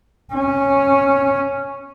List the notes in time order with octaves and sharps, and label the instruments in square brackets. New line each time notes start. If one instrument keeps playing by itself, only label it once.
[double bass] C#4